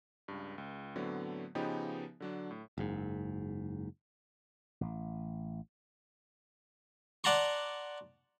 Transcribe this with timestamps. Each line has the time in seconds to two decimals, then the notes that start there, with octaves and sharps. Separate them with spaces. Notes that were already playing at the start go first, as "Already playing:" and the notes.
0.28 C#2 G2
0.58 C#2
0.96 A2 D3 F#3 A3 B3 C4
1.55 C#3 F3 B3 D#4 G4 B4
2.20 D3 F#3 D4
2.51 A2
2.78 F#1 G#2
4.81 A1
7.24 D5 F#5 A5 A#5 C6 C#6